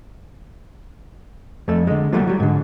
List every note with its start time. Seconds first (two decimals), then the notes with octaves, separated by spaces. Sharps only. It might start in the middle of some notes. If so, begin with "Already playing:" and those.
1.68 F2 A3
1.87 D3 G#3
2.13 F#3 G3 A3 A#3 F4
2.27 F#3 G3
2.40 G#2 D3